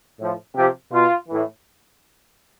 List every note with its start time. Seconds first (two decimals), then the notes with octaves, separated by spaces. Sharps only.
0.18 A2 F3
0.55 C3 F3 G4
0.91 B2 F4
1.28 A2 E3